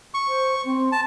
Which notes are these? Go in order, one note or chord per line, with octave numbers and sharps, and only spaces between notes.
C#6
C5
C4
A5